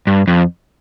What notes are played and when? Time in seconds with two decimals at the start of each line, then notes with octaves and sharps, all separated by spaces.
0.07 G2
0.28 F2